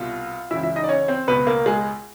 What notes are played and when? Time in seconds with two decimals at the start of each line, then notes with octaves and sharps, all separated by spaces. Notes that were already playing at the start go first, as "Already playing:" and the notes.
Already playing: C2 B2 F4 F5
0.51 C#2 C#3 E3 E4 E5
0.63 E4 E5
0.76 D#4 D#5
0.84 D5
0.89 C#4 C#5
1.08 C4 C5
1.28 C#2 B2 B3 B4
1.47 A#3 A#4
1.66 G#3 G#4